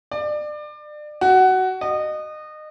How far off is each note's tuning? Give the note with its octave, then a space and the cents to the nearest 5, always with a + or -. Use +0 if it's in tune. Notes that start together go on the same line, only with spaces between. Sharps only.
D5 +30
F#4 +15
D#5 -25